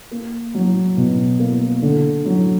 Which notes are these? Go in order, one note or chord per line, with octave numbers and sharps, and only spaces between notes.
A#3
F#3
B2
A#3
D3
F#3